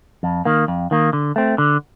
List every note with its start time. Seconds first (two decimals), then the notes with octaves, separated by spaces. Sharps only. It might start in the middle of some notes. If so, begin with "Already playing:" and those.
0.23 F2
0.45 D#3 A#3
0.68 F2
0.91 D#3 A#3
1.13 D3
1.36 A3 C4
1.58 D3